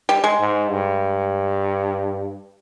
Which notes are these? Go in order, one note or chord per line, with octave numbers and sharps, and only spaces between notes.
G3
G#3
G#2
G2